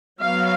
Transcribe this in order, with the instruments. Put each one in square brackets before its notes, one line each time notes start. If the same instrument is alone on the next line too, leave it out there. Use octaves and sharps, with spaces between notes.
[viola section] F#3 B3 F5